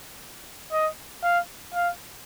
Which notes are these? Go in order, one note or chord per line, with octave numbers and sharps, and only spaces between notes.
D#5
F5
F5